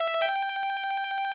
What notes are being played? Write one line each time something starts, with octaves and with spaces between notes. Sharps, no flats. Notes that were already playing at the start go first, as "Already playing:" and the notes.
Already playing: E5
G5